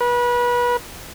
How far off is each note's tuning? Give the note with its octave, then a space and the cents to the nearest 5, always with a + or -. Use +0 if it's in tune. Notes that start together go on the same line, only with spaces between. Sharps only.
B4 -30